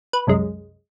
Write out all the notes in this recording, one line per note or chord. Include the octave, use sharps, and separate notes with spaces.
B4
C2 F#2 G#3